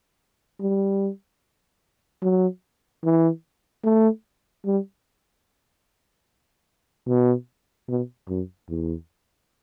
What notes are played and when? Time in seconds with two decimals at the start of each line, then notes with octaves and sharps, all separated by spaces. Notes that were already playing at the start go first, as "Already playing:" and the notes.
0.61 G3
2.22 F#3
3.04 E3
3.84 A3
4.66 G3
7.08 B2
7.89 B2
8.29 F#2
8.69 E2